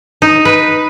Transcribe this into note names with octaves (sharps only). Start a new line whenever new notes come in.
D#4
B4